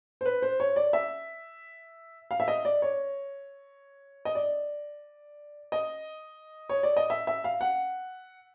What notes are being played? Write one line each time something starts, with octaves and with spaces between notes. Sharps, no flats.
C5
B4
C5
C#5
D5
E5
F5
E5
D#5
D5
C#5
D#5
D5
D#5
C#5
D5
D#5
E5
E5
F5
F#5